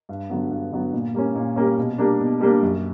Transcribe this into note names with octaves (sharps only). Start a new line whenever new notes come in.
G2
D3 F#3 B3
G2
D3 F#3 B3
A#2
G3 A#3 C#4
A#2
G3 A#3 C#4
B2
G3 A#3 D4
B2
G3 A#3 D4
F#2